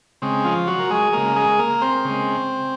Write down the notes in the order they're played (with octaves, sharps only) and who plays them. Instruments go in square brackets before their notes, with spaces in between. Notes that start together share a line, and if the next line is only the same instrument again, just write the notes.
[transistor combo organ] C#3 G#3 C4
F3 F4
F#3 F#4
A#4
G#3 G#4
C#3 G#3 A#3 A#4
G#3 G#4
A#3 A#4
C4 C5
C#3 G#3